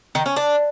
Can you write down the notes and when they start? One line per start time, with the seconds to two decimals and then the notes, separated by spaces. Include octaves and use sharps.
0.15 D#3
0.26 C#4
0.36 D4